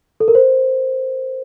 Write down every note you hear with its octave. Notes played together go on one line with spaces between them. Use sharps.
A4
A#4
C5